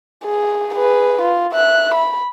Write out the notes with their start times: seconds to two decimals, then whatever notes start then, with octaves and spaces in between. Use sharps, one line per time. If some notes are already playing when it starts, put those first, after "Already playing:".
0.24 G#4
0.74 G#4 B4
1.21 F4
1.53 E5 F#6
1.94 B5